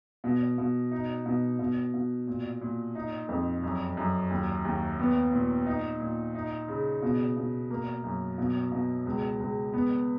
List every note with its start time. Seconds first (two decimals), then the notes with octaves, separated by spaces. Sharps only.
0.24 B2
0.58 B2
0.91 D#4
1.26 B2
1.59 B2
1.94 B2
2.27 A#2
2.61 A#2
2.95 D#4
3.29 F2
3.63 F#2
3.97 F#2
4.31 D#2
4.65 D#2
4.99 B3
5.33 A#2
5.66 D#4
6.00 A#2
6.35 D#4
6.68 C#3
7.02 B2
7.37 B2
7.70 A#3
8.04 F#2
8.38 B2
8.72 B2
9.06 C#2
9.40 C#2
9.73 B3